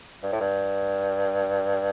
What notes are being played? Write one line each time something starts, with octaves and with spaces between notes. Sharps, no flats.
G2
A2
G2